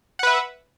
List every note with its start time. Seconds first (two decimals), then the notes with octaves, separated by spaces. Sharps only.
0.19 F#5
0.23 B4
0.27 E5